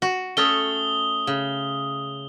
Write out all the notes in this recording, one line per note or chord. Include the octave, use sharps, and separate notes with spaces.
F#4
A3 C#4 A4 D#6 G7
C#3